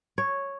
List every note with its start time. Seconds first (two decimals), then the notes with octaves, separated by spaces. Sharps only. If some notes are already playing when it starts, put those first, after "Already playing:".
0.18 C#5